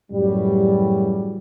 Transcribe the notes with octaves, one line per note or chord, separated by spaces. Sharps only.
F#2 A2 C#3 E3 F#3 G3